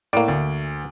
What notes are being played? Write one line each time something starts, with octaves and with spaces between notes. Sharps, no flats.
A2 A#3 D5 D7
D2